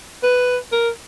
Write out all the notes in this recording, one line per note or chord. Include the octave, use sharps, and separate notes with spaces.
B4
A#4